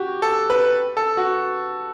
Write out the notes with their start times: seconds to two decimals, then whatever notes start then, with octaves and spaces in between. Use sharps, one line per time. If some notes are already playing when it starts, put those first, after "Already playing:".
Already playing: F#4 G4
0.22 A4
0.50 B4
0.97 A4
1.17 F#4